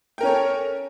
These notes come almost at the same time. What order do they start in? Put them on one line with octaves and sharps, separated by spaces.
G5 A#4 C#4 C#5 A4